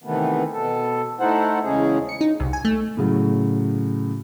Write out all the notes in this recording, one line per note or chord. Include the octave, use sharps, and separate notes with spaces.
C3 D#3 E3 A3 B3
B2 A4
A3 D#4 E4 A4 C5 F#5
E2 C#3 G#3 C#4 G#4
C#7
D#4
C2
G#5
A3
A2 C#3 F#3